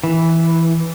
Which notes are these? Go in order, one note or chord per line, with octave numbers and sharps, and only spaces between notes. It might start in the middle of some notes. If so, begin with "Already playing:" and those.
E3